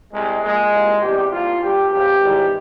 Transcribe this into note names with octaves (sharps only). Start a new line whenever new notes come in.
C2 C3 G3 G#3
A#1 A#2 F3 G#3
C2 A#2 F3
E2 C3 G3 G4
C2 A#2 F3 F4
G2 G3 G4
C#2 C3 F3 G4
G#1 G#2 E3 G3